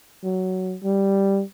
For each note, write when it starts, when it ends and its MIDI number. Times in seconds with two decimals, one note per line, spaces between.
0.24 0.75 54
0.83 1.42 55